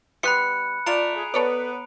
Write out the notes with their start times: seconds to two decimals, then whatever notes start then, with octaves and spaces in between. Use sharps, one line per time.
0.23 G3 B3 B5 C6 F#6 C#7
0.86 A3 F4 D5 A#5 D7 F7
1.16 G#4
1.34 B3 A4 B4 C#5 D5